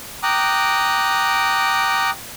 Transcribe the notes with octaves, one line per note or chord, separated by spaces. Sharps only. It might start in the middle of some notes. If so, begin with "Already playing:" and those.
G5 A#5 D6 D#6 F#6